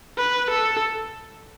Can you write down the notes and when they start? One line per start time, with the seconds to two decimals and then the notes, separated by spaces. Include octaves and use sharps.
0.18 B4
0.50 A4